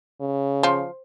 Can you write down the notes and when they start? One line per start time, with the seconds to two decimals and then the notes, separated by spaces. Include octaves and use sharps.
0.21 C#3
0.63 F3